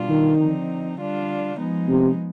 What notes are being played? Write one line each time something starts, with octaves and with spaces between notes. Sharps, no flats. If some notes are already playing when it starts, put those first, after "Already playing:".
Already playing: B2 G3 D4 F4
D#3
D3 F3 C4 D#4
D3 G3 D4 F4
F3 G#3 B3 D#4
C3